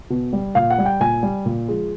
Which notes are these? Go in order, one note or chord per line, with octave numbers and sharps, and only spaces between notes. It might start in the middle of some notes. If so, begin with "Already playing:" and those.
B2
G3
A#2 F5
F#5
G3
G5
A#2 G#5
G3
A#2
F3 G#3